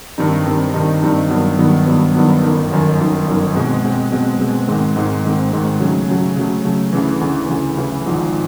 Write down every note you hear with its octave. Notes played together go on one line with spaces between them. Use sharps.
G2 D#3 G3 C4 D#4
G2 D#3 G3 C4 D#4
G2 D#3 G3 C4 D#4
G2 D#3 G3 C4 D#4
G2 D#3 F#3 B3
G2 D#3 F#3 B3
G2 D#3 F#3 B3
G2 D#3 F#3 B3
G1 F#2 D#3
G1 F#2 D#3
G1 F#2 D#3
G1 F#2 D#3
B2 G#3 C4
B2 G#3 C4
B2 G#3 C4
B2 G#3 C4
G#2 D#3 G#3 C4
G#2 D#3 G#3 C4
G#2 D#3 G#3 C4
G#2 D#3 G#3 C4
C#3 F#3 A3
C#3 F#3 A3
C#3 F#3 A3
C#3 F#3 A3
D2 C#3 E3
D2 C#3 E3
D2 C#3 E3
D2 C#3 E3
G#1 G#2 F3